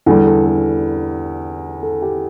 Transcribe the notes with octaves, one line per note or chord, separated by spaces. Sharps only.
E2 D3 G3 A4
A4
A4
A4
G4